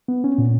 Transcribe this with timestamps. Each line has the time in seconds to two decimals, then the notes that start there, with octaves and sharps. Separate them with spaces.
0.08 B3
0.24 C#4
0.38 A#2